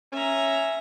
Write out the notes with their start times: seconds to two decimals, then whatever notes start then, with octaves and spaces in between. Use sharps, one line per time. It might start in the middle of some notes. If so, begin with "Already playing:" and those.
0.12 C#4 E5 A#5